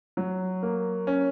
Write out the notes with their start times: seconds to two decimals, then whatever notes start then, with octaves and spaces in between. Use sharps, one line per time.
0.17 F#3
0.63 A#3
1.07 C#4